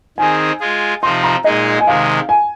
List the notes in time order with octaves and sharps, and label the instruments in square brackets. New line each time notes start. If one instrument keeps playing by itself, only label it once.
[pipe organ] D#3 C4 D#4 G#4 [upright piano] G#5
[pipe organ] G#3 F4 G#4
[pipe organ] C3 F3 C4 D#4 [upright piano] C6
[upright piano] A#5
[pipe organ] A#2 G#3 D#4 G#4 [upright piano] D#5
[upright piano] G#5
[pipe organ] C3 D#3 G#3 [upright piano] F5
[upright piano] G#5